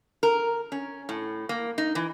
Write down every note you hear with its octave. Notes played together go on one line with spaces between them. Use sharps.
A#4
C#4
A2
A#3
D#4
E3